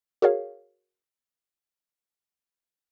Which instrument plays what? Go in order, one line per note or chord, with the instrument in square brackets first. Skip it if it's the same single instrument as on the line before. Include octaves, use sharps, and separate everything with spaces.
[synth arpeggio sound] F#4 G#4 A#4 C#5 F5